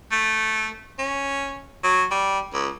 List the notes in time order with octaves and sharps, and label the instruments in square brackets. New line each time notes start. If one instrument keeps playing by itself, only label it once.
[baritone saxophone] A3
C#4
F#3
G3
C#2